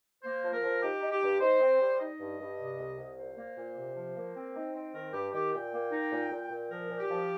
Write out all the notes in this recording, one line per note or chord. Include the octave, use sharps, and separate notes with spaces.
A#3 C5
F3
A#4
F3
D#4 G4
D#4
G4
G2
D#4 C5
C4
G3
D#4 D#5
G2
G2
C3
C2
C2
A#2 C5
A#3
A#2
C3
F3
A#3
C4
D#4
C4
D#3 A#4
G2 G4
D#3 G4
A#2 G5
A#3
D#4
A#2
A#2
A#2
F3 A#4
A#2
G4
F3